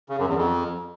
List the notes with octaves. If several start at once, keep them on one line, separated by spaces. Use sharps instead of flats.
C#3
F#2
E2
F2